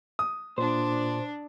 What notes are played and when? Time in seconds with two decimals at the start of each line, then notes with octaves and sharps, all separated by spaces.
0.19 D#6
0.58 A#2 D4 C5